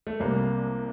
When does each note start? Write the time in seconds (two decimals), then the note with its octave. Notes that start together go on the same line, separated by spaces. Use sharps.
0.07 A3
0.20 C2 C3 G3 A#3